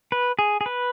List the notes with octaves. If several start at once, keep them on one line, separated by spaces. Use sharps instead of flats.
B4
G#4
G#4
B4